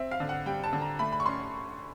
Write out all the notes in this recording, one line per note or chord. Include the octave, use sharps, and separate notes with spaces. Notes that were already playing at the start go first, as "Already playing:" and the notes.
Already playing: C4 E5
F5
D3
F#5
G3 G5
A5
D3
A#5
A3 B5
B5
C#6
C#4 C6